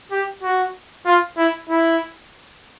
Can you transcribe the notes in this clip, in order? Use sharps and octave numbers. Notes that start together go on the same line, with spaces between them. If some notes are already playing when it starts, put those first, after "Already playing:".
G4
F#4
F4
E4
E4